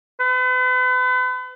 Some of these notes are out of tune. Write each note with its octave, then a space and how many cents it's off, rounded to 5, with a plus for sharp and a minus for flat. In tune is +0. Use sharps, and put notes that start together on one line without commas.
B4 +40